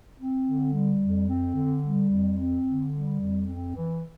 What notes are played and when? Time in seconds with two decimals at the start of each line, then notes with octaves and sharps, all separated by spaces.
0.19 C4
0.45 D3
0.72 G3
1.00 F2
1.28 C4
1.55 D3
1.82 G3
2.10 F2
2.37 C4
2.66 D3
2.92 G3
3.20 F2
3.47 C4
3.74 E3